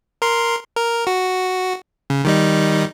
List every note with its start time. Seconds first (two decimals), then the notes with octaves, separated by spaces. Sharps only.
0.22 A#4 C6
0.75 A#4
1.07 F#4
2.10 C#3
2.25 D#3 G3 D#4